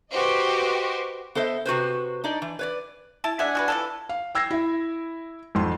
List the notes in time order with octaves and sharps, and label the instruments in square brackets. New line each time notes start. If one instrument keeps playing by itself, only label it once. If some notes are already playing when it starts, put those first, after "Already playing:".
[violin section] F#4 G4 B4 C5 D#5
[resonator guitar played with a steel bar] B3 A4 C5 D#5 E5
C3 F#4 B4 C5
D4 D#4 D5 D#5
E3
B4 C#5 D5
[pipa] E4 A5
[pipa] G#3 E5 [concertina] D4 F#5 G#5
[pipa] A3 F#4 B4
E3 F3 A4
[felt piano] F5
G5 E6 G#6 A#6 C7
E4 E5
G#1 F2 C6